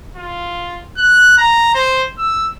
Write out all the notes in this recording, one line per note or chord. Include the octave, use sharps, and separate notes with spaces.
F4
F#6
A#5
C5
E6